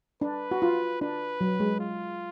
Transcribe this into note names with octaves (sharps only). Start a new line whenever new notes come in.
D4 B4
F#4
F4
D4 B4
F#3
G#3
F4